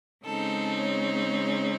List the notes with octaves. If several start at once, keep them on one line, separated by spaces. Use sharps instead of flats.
C#3 G#3 C4 D#4 A4
C#5